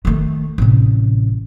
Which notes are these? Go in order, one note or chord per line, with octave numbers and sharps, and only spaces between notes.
D#3 A3
A1 C3